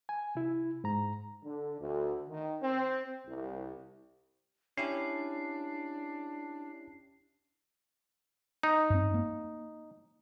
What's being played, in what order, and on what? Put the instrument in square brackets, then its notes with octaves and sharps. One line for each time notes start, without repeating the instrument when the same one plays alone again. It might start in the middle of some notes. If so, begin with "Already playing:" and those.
[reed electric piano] G#5
C3 E4
G#2 A#5
[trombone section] D3
D2
D#3
C4
C2
[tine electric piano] C#4 E4 G4 [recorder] D4 [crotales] C7
[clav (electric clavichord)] D#4
[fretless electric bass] G2 C4
A#3